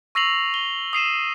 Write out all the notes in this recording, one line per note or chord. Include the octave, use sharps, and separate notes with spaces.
C#6 E6 A#6 C7 F7 F#7
G7
D#6 C7 D#7 E7